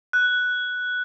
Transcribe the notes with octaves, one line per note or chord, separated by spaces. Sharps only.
F#6